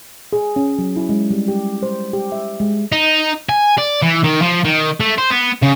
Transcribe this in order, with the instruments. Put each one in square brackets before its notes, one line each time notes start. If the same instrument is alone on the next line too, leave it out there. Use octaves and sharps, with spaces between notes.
[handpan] G#4
C#4
F#3
E4
G#3
G3
G4
C5
G4
E5
G#3
[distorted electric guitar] D#4
G#5
D5
E3
D#3
F3
D#3
A3
C5
B3
C#3